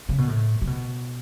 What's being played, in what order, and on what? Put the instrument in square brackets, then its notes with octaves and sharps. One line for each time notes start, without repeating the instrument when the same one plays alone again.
[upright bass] C#3
B2
A2
C#3
B2